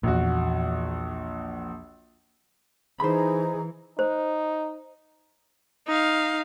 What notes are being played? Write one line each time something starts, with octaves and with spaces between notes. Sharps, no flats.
A#1 E2 A#2 F#4
E3 D#4 G#4 C5 A#5 B5
D#4 C5
D#4 F5